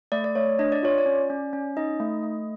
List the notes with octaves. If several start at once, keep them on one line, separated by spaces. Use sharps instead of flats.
A3 D5
D5
A3 C#5
D4 D#5
D5
F4 C#5
D5
C#4
C#4
C#4
D#4 D#5
A3
A3